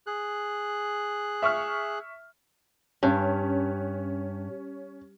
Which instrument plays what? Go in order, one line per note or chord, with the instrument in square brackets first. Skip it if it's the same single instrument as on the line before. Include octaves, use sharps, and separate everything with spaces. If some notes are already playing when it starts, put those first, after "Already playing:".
[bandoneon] G#4 F#6
[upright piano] E5 C#6 F6
[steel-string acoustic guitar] G2 [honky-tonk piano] C#4